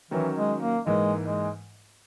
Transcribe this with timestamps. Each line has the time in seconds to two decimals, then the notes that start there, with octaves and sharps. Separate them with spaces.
0.11 D#3 E3 F#3 C#4
0.36 G#3
0.61 A#3
0.86 G#2 E3 G#3 A#3
1.23 G#3